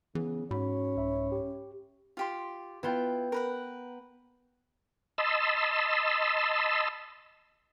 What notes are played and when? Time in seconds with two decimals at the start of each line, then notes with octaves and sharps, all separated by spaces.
0.15 C#3 E3 B3 G#4
0.51 G#2 C#4 F#4 C#5 B5
0.96 C2 E5 B5
1.32 G4
2.17 F4 G4 C6
2.83 B3 E4 F4 G5
3.32 A#4 B4 F#5
5.18 D#5 A5 B5 C6 E6